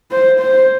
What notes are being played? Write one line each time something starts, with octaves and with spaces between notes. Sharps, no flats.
C5
C5